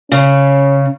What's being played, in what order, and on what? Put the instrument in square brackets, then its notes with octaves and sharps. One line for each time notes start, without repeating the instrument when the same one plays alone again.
[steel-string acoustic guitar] C#3 [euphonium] C#4